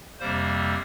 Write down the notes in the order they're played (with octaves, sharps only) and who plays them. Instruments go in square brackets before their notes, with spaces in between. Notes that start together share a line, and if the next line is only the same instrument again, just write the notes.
[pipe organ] F2 C3 G3 A#3 C5